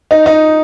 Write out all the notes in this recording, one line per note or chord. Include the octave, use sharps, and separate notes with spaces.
D#4
D#4